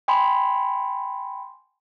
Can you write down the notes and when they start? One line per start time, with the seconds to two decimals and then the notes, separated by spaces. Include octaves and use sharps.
0.08 G5 G#5 B5 C6